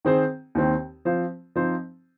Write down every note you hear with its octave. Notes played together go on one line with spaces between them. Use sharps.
D#3 C4 G#4 C5
D#2 D#3 C4
F3 C4 F4 C5
F3 C4 D#4 C5